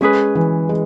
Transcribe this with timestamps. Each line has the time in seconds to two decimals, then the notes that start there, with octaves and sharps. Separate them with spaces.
0.01 G#3 C#4 G#4 B4
0.35 E3
0.69 G#3